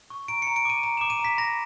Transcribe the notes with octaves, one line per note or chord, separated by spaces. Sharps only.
C#6
A#5 D7
A#5 C#7
D7
D6 D#7
A#5 D#7
D6 E7
D#7
A#5
B6
B5 A#6